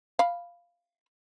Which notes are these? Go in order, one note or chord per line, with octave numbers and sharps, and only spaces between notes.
F5 B5